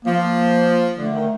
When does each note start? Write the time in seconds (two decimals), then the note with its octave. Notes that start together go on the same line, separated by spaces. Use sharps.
0.05 F3 A#3
0.98 D3 A3
1.14 D#3